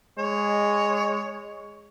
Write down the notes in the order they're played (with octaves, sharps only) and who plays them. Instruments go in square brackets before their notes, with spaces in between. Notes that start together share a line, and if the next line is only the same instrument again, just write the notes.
[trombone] G#3 [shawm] C#5